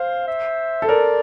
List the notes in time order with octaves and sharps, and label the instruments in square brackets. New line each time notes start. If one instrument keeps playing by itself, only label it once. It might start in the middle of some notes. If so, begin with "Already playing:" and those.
Already playing: [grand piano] C5 [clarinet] F5
[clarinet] E5
[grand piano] A4
[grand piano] A#4 [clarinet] D5